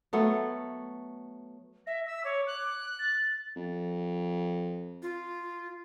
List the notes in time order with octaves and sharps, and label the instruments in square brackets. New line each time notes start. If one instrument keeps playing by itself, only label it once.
[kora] F#3 A3 B3
[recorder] E5 [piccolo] A#6
[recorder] E6 [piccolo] B6
[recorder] C#5 [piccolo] D6
[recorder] F#6
[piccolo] A6
[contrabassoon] F2
[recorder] F4